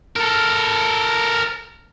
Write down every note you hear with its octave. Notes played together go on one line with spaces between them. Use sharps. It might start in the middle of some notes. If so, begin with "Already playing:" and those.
A4 A#4